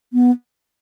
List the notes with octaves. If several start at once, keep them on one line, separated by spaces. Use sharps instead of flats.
B3